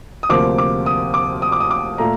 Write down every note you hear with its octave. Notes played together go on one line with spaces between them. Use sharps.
D#6
D2 C3 F3 A#3 D6
D6
D#6
D6
D#6
D6
D#6
D6
A#2 A3 A#5